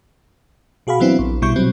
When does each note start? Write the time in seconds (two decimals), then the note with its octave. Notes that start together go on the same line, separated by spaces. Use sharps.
0.87 B2 F#4 G#4 F5 B5
1.00 E3 F#3 B3 C4 D4 E4
1.19 A#1
1.42 B1 B2 G3 E4 C#6 G6
1.56 B2 F#3 G3 C4